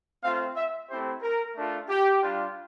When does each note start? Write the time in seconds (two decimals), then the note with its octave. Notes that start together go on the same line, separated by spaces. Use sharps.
0.22 A3 C4 F4 F5
0.56 E5
0.89 A3 C4 E4 G4 C5
1.22 A#4
1.56 A3 D4 F4
1.89 G4
2.22 G3 D4 F4